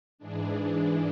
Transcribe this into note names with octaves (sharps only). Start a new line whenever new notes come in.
G#2 E3 G#3 D4